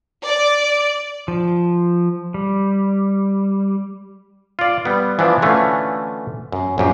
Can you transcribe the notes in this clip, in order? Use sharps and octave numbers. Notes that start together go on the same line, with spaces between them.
D5
F3
G3
F4 D5
G3 B3
E3 F3 B3 D4
D3 E3 A3 C#4 F4
F#2
A#1 F#2 G4